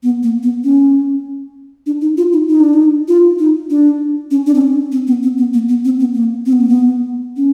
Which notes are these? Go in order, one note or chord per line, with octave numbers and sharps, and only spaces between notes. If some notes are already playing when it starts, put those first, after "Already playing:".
B3
A#3
B3
C#4
D4
D#4
F4
D#4
D#4
D4
D#4
F4
D#4
D4
C#4
D4
C4
C#4
C4
B3
C4
B3
A#3
B3
C4
B3
A#3
C4
B3
A#3
B3
C#4